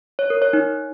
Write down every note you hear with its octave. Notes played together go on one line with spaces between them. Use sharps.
C#5
A#4
C#5
D#4